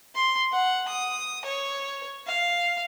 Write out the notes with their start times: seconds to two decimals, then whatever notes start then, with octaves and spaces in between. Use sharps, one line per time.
0.15 C6
0.52 F#5
0.88 D#6
1.45 C#5
2.27 F5